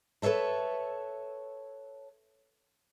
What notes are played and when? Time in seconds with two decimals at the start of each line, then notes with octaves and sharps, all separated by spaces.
0.22 A4 B4 C#5 E5 A5